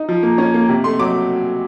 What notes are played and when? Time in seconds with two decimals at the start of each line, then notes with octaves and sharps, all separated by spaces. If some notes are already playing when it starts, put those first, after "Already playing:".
Already playing: D#4
0.09 F3
0.23 A#3
0.38 C#4
0.54 A#3
0.69 C3
0.84 A3 C6
0.99 F#3 D6